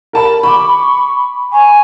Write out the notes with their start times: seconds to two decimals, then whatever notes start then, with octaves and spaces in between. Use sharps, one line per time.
0.13 A#4 A5 B5
0.43 B5 C#6 D6
1.53 G#5 C#6